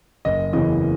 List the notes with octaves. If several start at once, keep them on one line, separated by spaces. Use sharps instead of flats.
F#1 D#5
E2 C#3 E3 D#5